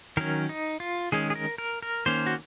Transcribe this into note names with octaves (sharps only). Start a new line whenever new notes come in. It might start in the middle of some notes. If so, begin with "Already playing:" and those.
D#3 F#3 C#4 A#4
D#4
F4
D#3 G#3 C#4 G#4
G#4
A#4
A#4
A#4
D#3 A#3 C#4 C5
F#4